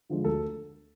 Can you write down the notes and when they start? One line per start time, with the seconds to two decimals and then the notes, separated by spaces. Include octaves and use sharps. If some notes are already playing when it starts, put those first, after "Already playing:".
0.10 D3 F3 G#3
0.24 D2 A4